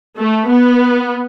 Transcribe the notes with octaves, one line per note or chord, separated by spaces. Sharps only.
A3
B3